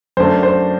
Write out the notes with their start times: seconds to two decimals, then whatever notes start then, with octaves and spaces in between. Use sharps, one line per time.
0.17 F#2 D3 A3 C5
0.43 C5